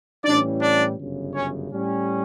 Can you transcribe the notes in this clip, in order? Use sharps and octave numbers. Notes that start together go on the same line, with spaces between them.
A2 E3 G3 C#4 D4 D5
D4 D5
G1 F#2 C#3
C#4 C#5
A2 G3 C#4